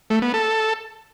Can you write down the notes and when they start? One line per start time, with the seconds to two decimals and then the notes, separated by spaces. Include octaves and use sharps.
0.10 A3
0.22 B3
0.34 A4